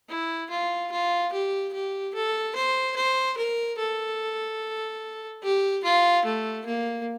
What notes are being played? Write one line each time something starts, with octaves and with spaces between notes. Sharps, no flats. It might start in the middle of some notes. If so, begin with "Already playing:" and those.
E4
F4
F4
G4
G4
A4
C5
C5
A#4
A4
G4
F4
A3
A#3